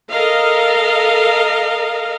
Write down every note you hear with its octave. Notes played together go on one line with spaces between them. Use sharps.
A4 A#4 D#5 F5